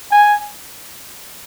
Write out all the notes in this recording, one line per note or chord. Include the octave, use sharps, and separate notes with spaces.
G#5